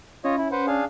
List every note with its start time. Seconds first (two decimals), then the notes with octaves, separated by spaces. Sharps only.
0.24 C#4 F4 C#5 D#5
0.37 E4
0.52 B4 C5 F#5
0.67 D4 G#4 F5